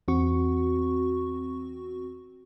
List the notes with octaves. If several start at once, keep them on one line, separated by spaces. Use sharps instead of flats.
E2 C4 F#4 C#6